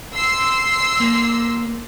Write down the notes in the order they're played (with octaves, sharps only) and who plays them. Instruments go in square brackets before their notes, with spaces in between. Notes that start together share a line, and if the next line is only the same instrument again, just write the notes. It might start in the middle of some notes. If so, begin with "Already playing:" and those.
[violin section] C6 E6 C7
[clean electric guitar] A#3